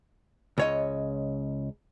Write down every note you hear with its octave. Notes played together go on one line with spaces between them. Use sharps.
C#2 C#5 D#5